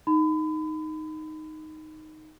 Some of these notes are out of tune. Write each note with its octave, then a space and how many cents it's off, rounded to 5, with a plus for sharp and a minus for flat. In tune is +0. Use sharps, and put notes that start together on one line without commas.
D#4 +0 B5 +35